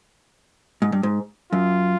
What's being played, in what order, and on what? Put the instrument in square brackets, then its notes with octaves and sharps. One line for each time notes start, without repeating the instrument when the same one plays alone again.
[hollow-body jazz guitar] G#2
G2
G#2
[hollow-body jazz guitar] F#2 [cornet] F4